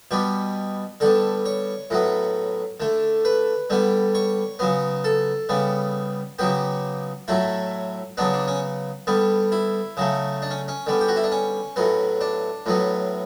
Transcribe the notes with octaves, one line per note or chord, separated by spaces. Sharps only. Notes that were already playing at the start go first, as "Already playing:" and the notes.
B2 G3 B3 G4
D3 G3 B3 A4
C#5
A2 F#3 B3
D3 A3
B4
D3 G3 B3
C#5
C#3 F#3 B3
A4
C#3 G3 B3
C#3 F#3 B3 G4
A2 F#3 A3 E4
C#3 F#3 B3 D4
D4
C#4
D3 G3 B3
E4
C#3 F#3 A3
D4
C#4
C#4
D3 G3 B3
G4
F#4
E4
D4
C#4
A2 F#3 B3
D4
A2 F#3 B3